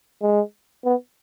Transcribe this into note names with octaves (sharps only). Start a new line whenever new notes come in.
G#3
B3